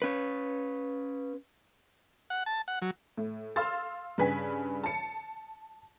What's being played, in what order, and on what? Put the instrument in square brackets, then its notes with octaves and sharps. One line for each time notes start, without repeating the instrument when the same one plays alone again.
[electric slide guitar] C#4 B4
[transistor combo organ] F#5
A5
F#5
F#3
[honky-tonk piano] A2
F5 C6 E6 F6 A6
G2 C#3 B4 G#5 B6
A5 C#7